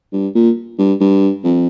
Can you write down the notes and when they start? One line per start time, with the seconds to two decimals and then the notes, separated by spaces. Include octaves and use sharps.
0.13 G2
0.35 A#2
0.79 G2
1.00 G2
1.44 F2